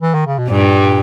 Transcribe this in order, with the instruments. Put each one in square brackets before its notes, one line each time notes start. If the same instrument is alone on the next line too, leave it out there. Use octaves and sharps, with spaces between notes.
[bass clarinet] E3
D#3
C#3
B2
[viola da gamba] G2 G3 [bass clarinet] A#2
[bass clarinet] A#2